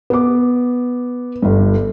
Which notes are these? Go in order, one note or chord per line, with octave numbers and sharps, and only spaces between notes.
B3 D6
G1 G2